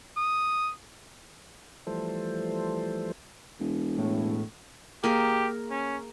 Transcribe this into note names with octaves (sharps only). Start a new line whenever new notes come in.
D#6
E3 F3 G3 A3 A4 C5
E1
A2
A#3 G4 G#4 A#4
C#4